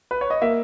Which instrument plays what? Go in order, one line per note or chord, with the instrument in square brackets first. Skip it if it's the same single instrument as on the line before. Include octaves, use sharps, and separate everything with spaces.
[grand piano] B4
C#5
D#5
[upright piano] A#3 [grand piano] E5